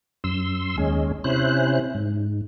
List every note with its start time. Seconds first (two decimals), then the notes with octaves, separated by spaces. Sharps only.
0.24 F#2 C6 E6
0.78 D#2 G#3 C#4
1.24 C3 C#4 E4 C5 F#6
1.95 G#2